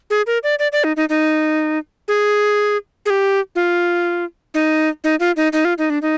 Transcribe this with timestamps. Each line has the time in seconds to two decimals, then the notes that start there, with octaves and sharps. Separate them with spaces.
0.10 G#4
0.27 A#4
0.43 D5
0.59 D5
0.72 D5
0.84 D#4
0.97 D#4
1.09 D#4
2.08 G#4
3.06 G#4
3.10 G4
3.55 F4
4.54 D#4
5.04 D#4
5.20 F4
5.37 D#4
5.53 D#4
5.65 F4
5.78 D#4
5.90 D4
6.02 D#4